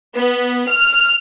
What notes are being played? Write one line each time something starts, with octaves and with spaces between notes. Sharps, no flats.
B3
F6